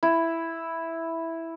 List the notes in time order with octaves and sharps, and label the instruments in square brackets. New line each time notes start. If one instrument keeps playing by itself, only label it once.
[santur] E4